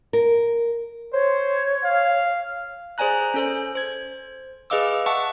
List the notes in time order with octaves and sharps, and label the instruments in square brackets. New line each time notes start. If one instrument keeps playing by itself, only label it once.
[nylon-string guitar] A#4
[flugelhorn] C5 [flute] C#5
[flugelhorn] F5
[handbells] G#4 C5 D5 G#5 A#5 F#6
C#4 A4 C5
C5 G#6
G#4 B4 D#5 F5 D6 E6
E5 F#5 A5 C#6